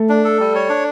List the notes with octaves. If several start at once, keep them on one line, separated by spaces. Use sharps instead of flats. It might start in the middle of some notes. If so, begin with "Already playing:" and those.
Already playing: A3
D4
A4
G3
C#5
D4